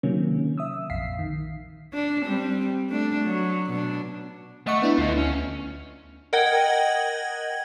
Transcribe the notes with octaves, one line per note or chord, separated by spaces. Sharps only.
C3 D#3 F#3 A#3 C#4
E5 D#6 E6
A#1 F2 F5 B6 C7
D#3
D4
G3 C4
A3 D4
F#3
B2 D4
A3 D#5 F#5 C#6
B3 D4 E4
D2 F4 D#5
C#4
A#4 D#5 F#5 G5 G#6